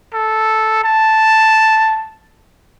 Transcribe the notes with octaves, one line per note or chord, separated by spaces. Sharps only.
A4
A5